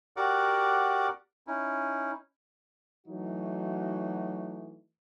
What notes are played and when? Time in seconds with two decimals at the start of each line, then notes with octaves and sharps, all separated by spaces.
0.17 F#4 G4 A#4 D5 F#5 D6
1.47 C#4 D#4 E4
3.07 E3 F#3 A3 D#4 F#4